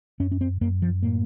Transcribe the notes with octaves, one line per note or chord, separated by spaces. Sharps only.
F#2 C#4
C#4
C4
F#2 A#3
F3
A2 A#3